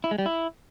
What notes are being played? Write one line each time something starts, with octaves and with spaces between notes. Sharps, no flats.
E4
G#3
G3
E4